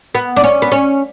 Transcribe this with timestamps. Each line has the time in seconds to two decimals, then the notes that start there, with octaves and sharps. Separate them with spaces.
0.15 B3
0.37 D4
0.44 C#4
0.62 B3
0.72 C#4